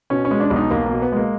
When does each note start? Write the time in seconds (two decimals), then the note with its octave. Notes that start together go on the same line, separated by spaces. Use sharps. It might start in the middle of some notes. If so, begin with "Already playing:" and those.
0.10 B2 C#4
0.25 C#4
0.31 G#3
0.40 D4
0.50 B1
0.56 D#4
0.71 B1 A#3
0.86 A#3
0.92 B2
1.02 B3
1.12 G#3 A#3